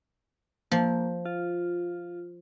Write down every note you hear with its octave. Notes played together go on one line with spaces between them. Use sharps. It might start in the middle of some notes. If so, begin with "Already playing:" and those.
F3 A#3
F4